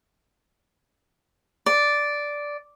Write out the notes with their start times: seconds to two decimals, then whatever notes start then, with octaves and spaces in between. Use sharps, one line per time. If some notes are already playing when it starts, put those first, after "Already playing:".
1.66 D5